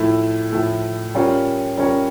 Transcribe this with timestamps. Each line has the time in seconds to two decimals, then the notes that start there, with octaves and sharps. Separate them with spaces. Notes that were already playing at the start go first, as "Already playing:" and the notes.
Already playing: A2 F3 A3 E4
0.52 A2 F3 A3 E4
1.15 G3 C#4 F4 A#4 C#5
1.77 G3 C#4 F4 A#4 C#5